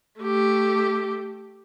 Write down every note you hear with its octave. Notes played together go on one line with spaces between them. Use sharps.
A3 G4